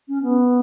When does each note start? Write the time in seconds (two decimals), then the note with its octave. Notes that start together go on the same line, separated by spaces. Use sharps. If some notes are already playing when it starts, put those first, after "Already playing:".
0.08 C#4
0.23 B3